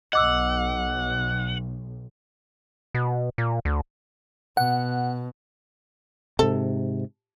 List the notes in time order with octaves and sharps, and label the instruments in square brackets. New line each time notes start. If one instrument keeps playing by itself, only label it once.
[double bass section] B1 [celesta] D#5 D6 E6 [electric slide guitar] F#5
[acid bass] B2
A#2
D2
[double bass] B2 [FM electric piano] F#5
[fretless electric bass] G#2 C3 [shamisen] A4